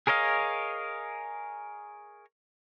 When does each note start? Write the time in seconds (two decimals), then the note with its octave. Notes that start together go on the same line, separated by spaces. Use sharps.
0.07 G#4 A#4 C#5 D#5 F5